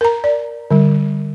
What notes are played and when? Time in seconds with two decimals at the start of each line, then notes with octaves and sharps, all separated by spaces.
0.01 A#4 A#5
0.24 D5
0.71 D3 G3